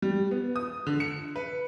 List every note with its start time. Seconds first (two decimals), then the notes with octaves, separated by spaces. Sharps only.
0.02 G3
0.31 B3
0.56 D#6
0.87 D3
1.00 C#7
1.36 B4